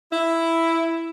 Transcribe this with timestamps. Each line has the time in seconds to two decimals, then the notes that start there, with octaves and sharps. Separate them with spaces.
0.12 E4